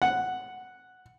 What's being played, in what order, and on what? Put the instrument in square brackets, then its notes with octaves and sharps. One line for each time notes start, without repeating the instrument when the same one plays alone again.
[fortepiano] F#5